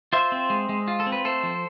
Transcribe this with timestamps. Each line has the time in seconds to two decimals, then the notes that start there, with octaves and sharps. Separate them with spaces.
0.13 F4 C5 E5
0.32 C4
0.50 G#3
0.69 G#3
0.88 F4
1.00 A4
1.06 C4
1.12 B4
1.25 A3 A4 C5
1.43 F3